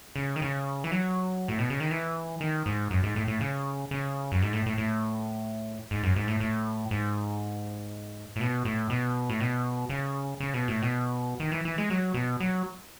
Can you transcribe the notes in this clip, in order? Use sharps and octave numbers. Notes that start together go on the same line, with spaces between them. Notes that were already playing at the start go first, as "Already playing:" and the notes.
C#3
D#3
C#3
E3
F#3
A2
B2
C#3
D#3
E3
D#3
G#2
F#2
G#2
A2
A2
C#3
C#3
F#2
G#2
A2
A2
A2
G#2
F#2
G#2
A2
A2
G#2
A2
B2
A2
B2
A2
B2
C#3
C#3
B2
A2
B2
D#3
E3
E3
G#3
F#3
B2
F#3